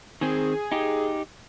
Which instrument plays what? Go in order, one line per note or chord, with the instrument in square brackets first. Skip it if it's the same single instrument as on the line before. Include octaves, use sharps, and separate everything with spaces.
[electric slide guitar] D#3 C4 [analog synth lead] G#4
[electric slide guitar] D#4 G4